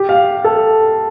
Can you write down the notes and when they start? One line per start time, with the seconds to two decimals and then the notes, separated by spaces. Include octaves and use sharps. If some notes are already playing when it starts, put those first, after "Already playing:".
Already playing: G4
0.09 F5
0.44 A4